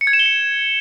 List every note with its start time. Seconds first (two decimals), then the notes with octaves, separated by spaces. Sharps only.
0.01 C#7
0.07 G#6
0.13 E7
0.19 G7
0.26 C#7